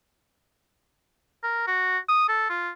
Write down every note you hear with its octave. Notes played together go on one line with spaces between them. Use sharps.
A#4
F#4
D#6
A4
F4